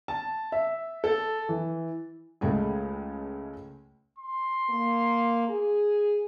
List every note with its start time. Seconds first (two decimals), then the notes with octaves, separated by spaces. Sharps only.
0.08 A5
0.52 E5
1.04 A4
1.49 E3
2.41 C#2 G#3 A3 G#4
4.19 C6
4.69 A#3
5.49 G#4